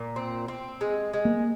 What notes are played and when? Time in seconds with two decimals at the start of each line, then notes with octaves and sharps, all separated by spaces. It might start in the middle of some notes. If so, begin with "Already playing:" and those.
Already playing: A#2
0.16 C4
0.48 C4
0.81 G#3
1.13 G#3
1.25 A#3